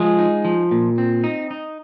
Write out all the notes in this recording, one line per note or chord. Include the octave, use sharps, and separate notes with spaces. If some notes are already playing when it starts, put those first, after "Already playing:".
Already playing: F3 G#3 F4 G#4
D#4
F3
A#2
C4
D#4
D#4